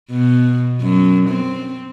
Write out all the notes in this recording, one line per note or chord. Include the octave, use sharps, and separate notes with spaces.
B2
F#2
C4